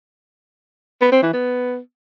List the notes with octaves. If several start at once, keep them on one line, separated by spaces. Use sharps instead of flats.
B3
C4
E3
B3